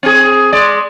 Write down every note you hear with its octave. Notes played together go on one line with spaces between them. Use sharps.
C4 G#4
G#3 D5